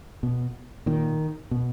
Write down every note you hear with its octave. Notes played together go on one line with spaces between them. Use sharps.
B2
A#2 D#3
B2